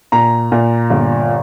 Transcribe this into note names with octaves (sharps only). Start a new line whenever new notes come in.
A#2 A#5
A#2
G1